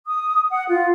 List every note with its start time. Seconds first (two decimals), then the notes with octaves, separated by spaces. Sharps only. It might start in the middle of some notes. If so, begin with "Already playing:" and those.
0.06 D#6
0.50 F#5
0.68 F4